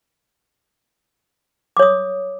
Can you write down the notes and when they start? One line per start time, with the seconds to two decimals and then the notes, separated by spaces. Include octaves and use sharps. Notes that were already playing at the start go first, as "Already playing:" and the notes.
1.77 D6
1.79 C#5
1.82 D#6